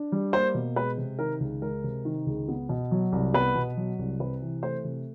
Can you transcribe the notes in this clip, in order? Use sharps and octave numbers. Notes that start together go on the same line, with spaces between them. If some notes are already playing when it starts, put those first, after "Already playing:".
Already playing: D4
G3
A#3 C5
B2
G#3 B4
C3
D#3 A#4
C#2
G#3 A#4
C3
D#3
C#2
B3
B2
F#3
C2
B3 B4
B2
F#3
C2
C3 B4
E3
A3 C5
C3